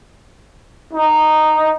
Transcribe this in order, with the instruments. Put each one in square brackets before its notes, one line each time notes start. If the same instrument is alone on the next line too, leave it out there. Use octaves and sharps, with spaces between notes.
[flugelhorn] D#4